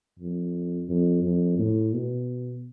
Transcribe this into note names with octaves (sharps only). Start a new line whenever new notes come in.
F2
F2
F2
A2
B2